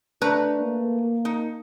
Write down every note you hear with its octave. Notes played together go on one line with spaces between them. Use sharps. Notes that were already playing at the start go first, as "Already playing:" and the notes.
A3 D4 B4 A#5
A#3
D#4